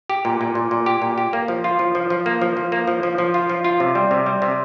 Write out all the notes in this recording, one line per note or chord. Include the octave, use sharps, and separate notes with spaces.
G4
A#2
A#2
A#2
A#2
G4
A#2
G4
A#3
F3
F4
F3
F3
F3
A#3
F3
F3
A#3
F3
F3
F3
F4
F3
F4
C3
G3
C3
G3
C3